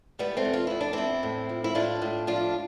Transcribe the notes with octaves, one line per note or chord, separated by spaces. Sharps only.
E2 G3 B3
A3 C4
E2
F4
E2 E4
D4
E2 C4 E4
A2
F3
E4
A2 D4 F4
A2
F3 D4 F4